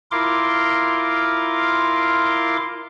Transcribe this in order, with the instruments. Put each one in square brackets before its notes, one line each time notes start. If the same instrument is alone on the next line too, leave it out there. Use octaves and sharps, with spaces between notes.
[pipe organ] E4 F4 A#4 C6 D6